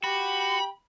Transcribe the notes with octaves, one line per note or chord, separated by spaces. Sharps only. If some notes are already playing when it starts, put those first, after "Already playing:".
F#4 G4 G5 B5